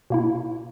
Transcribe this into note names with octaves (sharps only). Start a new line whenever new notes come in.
B2 A#3 E4